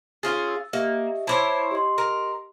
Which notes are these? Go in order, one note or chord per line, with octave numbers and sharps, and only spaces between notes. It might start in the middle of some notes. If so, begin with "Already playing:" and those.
C#4 F4 G#4 A6
E6
A#3 G4 D#5 E5
E4 C5 C#5 A5 B5 D6
G4 D#5 C6
A#4